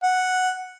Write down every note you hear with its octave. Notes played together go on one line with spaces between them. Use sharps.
F#5